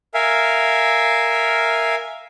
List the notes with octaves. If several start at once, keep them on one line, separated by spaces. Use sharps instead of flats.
A#4 E5 F5 G#5